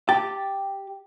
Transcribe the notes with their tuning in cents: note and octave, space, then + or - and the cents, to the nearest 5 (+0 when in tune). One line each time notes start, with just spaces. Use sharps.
G4 +0 A5 +0